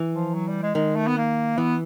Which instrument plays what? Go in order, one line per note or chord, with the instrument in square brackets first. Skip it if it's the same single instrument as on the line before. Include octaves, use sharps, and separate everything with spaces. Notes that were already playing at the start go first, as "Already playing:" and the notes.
Already playing: [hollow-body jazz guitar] E3
[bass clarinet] F3
F#3
G3
G#3
[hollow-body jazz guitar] D#3 [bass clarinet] G#3
[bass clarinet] A3
B3
A#3
[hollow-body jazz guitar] E3 [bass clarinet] B3